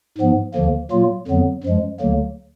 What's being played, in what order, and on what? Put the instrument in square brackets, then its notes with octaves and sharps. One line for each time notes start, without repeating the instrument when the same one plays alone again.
[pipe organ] G#2 F3 B3
D#2 D3 F3 A#3
A#2 F#3 A#3 F4
F2 D3 F#3 B3
F#2 F3 G#3
D2 D3 F#3 A#3